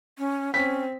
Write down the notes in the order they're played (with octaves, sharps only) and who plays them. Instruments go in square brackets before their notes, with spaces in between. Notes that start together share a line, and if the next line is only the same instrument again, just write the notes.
[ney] C#4
[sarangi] C4 [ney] C#4 [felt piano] B6